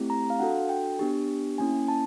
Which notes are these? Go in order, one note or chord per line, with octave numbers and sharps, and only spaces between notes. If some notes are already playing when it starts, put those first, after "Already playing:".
Already playing: A3 C4 E4 G4
A#5
F5
D4 F#4 A4 F#5
G5
B3 D4 G4
A#3 C#4 E4 G#5
A5